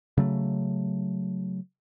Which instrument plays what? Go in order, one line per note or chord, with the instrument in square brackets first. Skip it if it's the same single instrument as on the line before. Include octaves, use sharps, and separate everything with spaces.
[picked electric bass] C#3 F#3 A3